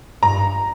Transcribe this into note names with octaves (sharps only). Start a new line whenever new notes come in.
G2 A#5